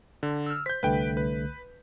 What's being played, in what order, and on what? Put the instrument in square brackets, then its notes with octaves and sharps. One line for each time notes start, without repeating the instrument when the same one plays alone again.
[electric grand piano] D3
[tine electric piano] E6 F6
[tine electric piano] C5 [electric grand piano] G6 B6
[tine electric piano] C2 D3 A3 [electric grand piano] B4 G5
[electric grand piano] B4